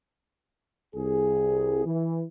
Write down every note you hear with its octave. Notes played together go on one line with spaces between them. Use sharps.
C2 G#4
E3